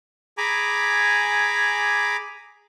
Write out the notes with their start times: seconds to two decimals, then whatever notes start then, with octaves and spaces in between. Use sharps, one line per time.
0.38 G#4 G#5 A#5 B5 D6